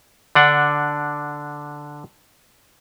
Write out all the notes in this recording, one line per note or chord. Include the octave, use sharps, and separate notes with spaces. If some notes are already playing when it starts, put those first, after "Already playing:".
D3 D4 F#5